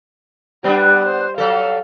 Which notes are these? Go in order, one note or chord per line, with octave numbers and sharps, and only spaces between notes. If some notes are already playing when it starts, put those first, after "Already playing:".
G3 B3 D4
C5
F#3 A4 F5